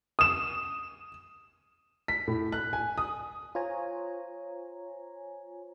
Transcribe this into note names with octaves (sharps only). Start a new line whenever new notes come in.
D#6 E7
B6
A2
F#6
G#5
D#6
F4 C5 C#5 G#5 A#5